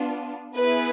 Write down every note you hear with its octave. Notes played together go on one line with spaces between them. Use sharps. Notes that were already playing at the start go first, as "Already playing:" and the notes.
Already playing: B3 D4 F4
B3 E4 G#4 B4